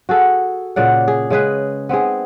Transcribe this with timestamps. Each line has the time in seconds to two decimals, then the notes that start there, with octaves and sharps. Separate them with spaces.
0.09 F#4 G#4 A4
0.76 A#2 C#3 D5 F#5
1.08 G#4
1.30 C#3 G#3 G#4 B4
1.89 B3 C4 D#4 G#4